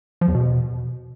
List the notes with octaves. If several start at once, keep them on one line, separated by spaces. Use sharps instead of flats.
F3
E2
B2